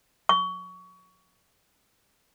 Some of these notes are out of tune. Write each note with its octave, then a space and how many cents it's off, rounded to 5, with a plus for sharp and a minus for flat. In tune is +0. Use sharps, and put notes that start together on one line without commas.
C#6 +25